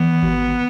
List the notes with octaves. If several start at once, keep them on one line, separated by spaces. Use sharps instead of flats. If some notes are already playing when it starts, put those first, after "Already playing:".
Already playing: E3 B3
G#1